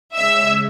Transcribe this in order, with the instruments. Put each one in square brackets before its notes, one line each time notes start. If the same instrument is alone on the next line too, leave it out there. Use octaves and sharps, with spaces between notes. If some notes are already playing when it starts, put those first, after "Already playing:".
[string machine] C#3 G#3 C#4 [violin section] E5 E6